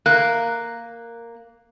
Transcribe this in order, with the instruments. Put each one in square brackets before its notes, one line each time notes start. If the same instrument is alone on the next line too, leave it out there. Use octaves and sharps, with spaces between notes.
[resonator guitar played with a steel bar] A#3 [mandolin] F#6